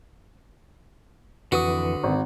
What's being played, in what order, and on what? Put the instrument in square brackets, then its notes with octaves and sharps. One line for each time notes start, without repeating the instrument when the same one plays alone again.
[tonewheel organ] F2 E3 [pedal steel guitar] D3 B4 D#6 [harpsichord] F#4
[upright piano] G#1